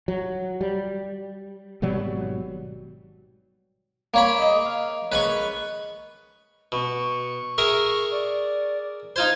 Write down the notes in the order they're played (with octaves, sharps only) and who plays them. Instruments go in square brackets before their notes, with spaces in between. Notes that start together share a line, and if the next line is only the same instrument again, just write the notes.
[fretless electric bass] F#3
G3
G#1 B2 F#3 G3
[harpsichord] A#3 C#5 B5
[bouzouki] D#4 G#4 D#5
F5
[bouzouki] D#3 G#3 C#4 [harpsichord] B4 B5 C#6
[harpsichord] B2 [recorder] C#6
[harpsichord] G#4 A#4 E5
[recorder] D5
[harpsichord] D#4 F4 C5 [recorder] G#6